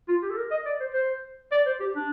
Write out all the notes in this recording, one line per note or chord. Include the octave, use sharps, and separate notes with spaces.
F4
G4
A4
A#4
D#5
D5
C5
C5
D5
C5
G4
D4